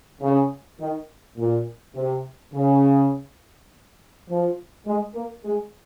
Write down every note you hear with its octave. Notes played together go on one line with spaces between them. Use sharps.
C#3
D#3
A#2
C3
C#3
F3
G#3
A#3
G#3